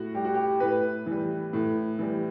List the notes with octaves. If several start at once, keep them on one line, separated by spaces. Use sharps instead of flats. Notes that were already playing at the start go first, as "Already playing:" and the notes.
Already playing: A2 F#4
G3 G4
F#4
G4
A2 B4
E3 G3
A2
E3 G3